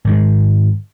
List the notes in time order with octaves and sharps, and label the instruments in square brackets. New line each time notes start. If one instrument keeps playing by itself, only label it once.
[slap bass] G#2 D#3 G#3